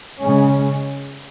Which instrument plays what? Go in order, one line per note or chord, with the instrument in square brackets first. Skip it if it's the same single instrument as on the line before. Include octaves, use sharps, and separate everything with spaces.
[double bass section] C#3 G#3 C#4